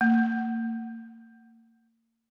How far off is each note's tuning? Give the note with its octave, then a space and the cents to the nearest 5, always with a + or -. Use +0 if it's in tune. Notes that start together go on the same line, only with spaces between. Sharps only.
A#3 -40